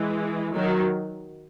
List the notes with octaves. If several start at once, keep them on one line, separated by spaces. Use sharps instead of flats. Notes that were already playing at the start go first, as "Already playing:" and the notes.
Already playing: E3 G#3
D#3 F#3